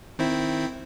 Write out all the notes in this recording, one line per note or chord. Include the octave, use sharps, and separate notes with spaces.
D#3 C4 E4